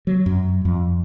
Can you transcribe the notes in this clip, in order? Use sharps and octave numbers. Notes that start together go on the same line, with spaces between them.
F#3
F#2
F2